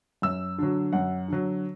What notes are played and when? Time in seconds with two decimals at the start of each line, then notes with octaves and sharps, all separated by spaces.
0.22 F#2 E6
0.58 D3 F#3
0.93 F#2 F#5
1.28 D3 F#3